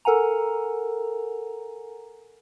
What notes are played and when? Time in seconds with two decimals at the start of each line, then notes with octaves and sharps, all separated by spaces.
0.05 A4 A#4 F#5 G#5 A#5